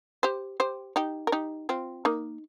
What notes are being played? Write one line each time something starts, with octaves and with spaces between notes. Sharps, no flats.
G4 C5
G4 C5
D#4 G4
A#4
D#4 G4
C4 F4
A#3 D#4